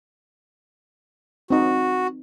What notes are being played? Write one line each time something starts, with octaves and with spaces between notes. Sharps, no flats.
C4 D#4 F#4